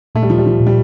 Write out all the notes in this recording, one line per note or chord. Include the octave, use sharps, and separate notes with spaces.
A#2 A3
G3
F3
G3
F3
A#2
G3